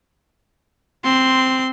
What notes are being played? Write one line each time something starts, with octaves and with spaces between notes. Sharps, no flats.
C4 C6